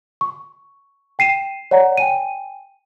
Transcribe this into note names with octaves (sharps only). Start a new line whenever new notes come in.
C#6
G5 C7 D#7 E7
C#5 D5 F#5 A#5
G5 G#5 D#7